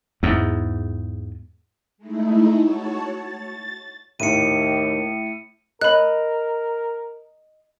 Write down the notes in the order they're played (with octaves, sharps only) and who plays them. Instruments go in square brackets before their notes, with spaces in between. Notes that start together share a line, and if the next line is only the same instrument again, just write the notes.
[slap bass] E2 G#2
[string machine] G#3 A3 D#4 E4
F#4 C#5 A5
A6
[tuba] D#2 [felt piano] A2 [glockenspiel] C#7 D#7
[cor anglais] A#4 [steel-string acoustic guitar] D#5 [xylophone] B5 F#6